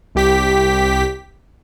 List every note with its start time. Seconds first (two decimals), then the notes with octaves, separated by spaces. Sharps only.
0.15 C2 G4 B6